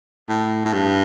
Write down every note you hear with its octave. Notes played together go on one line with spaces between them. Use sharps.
A2
A2
G2